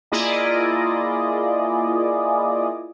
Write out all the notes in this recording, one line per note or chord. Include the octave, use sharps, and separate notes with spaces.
A#3 E4 F4 G#4 D5 D#5